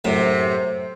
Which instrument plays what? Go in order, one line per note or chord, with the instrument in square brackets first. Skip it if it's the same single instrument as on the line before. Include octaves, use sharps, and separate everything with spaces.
[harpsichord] F#2 A2 [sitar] C3